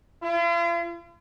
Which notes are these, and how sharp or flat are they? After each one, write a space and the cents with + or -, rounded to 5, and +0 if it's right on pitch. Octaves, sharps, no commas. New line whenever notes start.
F4 -45